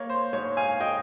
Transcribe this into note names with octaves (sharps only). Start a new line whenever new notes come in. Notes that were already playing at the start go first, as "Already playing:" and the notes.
Already playing: A#3 C#5
C5
G#2 C#5
F5 G#5
D#5 G5